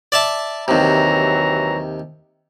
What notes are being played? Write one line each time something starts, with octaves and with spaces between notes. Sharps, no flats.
D5 E5 A5
D#2 C3 E3 F#3 A#5